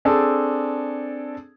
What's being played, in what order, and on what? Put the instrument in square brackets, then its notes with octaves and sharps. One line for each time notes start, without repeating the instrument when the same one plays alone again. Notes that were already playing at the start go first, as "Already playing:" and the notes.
[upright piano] C4 D4 G#4 A4